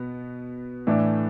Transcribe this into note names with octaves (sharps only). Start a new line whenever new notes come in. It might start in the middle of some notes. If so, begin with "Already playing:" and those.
Already playing: B2 B3
A2 E3 A3 D4